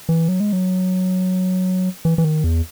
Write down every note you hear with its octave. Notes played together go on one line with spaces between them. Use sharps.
E3
F#3
G#3
F#3
E3
E3
D#3
E2